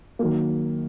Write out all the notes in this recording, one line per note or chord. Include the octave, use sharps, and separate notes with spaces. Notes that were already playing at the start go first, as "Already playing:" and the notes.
D#3 F#3 A#3